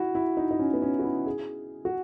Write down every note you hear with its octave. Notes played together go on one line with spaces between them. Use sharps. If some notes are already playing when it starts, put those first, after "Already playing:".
Already playing: E4 F#4
E4
D#4
D#4
C#4
B3
C#4
F#4
E4
G#4
F#4